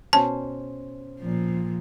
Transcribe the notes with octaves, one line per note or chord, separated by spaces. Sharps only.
B2 C#4 C5 A5
A#2 F3